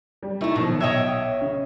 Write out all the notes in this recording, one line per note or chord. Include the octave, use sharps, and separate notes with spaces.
G3
A3 A#3 D#4 E4 A5
B2 D#3 F3 F#3
B1 C#5 D#5 E5 G5 G#6
C#3